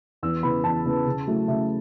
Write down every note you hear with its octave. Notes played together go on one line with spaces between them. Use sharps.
E2 E6
C#3 E3 B3 B5
E2 A5
C#3 E3 B3
C#3
F#3 A3 E4
C#3 E5